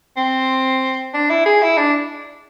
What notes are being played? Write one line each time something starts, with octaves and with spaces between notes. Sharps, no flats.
C4
D4
E4
G#4
E4
D4